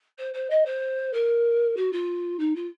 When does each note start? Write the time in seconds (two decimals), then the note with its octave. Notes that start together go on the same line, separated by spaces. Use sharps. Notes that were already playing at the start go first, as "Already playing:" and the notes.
0.18 C5
0.33 C5
0.50 D#5
0.65 C5
1.13 A#4
1.76 F#4
1.92 F4
2.39 D#4
2.55 F4